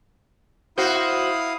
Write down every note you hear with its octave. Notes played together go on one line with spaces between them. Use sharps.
E4 F#4 C5 F5 D#6